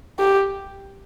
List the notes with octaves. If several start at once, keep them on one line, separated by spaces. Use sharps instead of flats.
G4